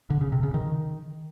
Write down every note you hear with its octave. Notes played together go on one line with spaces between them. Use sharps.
D3
C#3
C3
C#3
D#3